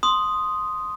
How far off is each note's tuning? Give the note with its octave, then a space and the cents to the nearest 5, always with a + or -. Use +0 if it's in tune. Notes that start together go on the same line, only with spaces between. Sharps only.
C6 +0 D#6 +0